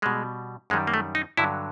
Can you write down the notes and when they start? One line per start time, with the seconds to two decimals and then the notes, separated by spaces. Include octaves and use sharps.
0.02 B2 G3 G#3
0.70 F#2 D#3 G3 G#3
0.87 A#3
0.94 A3
1.15 D#4
1.37 G2 D3 F#3 E4